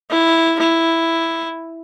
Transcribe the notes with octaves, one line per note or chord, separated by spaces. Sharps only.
E4
E4